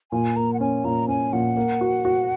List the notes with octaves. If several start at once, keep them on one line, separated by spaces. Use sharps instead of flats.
A#2 G#5
A#3 A#5
F#5
C#4 G#5
A#2 A#5
C#4 G#5
A#2 F#5
A#3
F#4
F#4